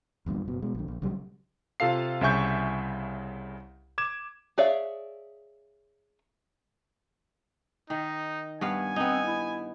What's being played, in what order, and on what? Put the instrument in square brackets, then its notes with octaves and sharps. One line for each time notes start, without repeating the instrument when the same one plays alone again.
[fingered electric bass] G1 E2 G2 A#2
F#1 B2
B2 G#3
A#1 D3
A#1
A#1 C#3 F#3 G3
[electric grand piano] C3 F4 A4 F5 C7
C2 C#3 E5 G#5 C#6 G6
D6 G#6 E7
[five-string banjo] G#4 C#5 D5 E5 F5
[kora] D#3 [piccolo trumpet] D#4
[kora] G2 B3 F5 [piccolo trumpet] G#5
[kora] B3 D#4 [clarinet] C4
[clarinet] E4